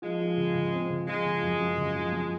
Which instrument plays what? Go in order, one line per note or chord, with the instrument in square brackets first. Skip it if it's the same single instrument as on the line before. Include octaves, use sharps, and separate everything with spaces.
[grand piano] F3 [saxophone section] G#3
[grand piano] F3
C#3
C#3
C4
C#3
[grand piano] F3 [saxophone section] G#3
[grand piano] C#3
F#2
F#2
C#3
F3
F#3